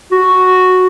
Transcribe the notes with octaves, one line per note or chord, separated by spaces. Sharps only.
F#4